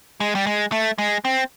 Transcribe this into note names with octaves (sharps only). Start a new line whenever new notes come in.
G#3
G3
G#3
A3
G#3
C4